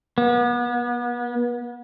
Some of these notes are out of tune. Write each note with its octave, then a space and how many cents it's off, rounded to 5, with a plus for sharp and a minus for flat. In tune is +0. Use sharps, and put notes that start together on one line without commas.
B3 -35